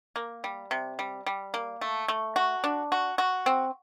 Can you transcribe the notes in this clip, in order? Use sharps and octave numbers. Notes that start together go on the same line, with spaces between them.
A#3
G3
C3
G3
G3
A#3
A3
A3
F#4
D4
F#4
F#4
C4